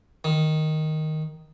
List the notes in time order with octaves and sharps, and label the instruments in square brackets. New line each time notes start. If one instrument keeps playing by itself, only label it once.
[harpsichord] D#3